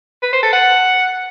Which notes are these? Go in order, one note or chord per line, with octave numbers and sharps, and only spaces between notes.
B4
C5
A4
F#5